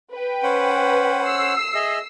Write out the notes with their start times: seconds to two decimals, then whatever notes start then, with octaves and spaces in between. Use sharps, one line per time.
0.12 B4 G5
0.43 C#4 C5 F#5
1.25 E6 C7
1.74 G#4 D#5 E5